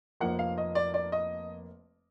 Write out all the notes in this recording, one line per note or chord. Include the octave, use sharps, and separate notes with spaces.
F1 F2 F3 A#3 F#5
F5
D#5
D5
D5
D#5